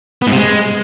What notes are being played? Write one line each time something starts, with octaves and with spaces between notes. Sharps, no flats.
B3
G#2
C3
G#3